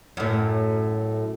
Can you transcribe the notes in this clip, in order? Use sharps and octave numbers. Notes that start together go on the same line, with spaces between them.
F#2 A2